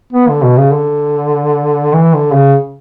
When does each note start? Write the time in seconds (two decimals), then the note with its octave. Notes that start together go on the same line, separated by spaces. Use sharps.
0.13 B3
0.29 D3
0.43 B2
0.58 C#3
0.74 D3
1.94 E3
2.14 D3
2.34 C#3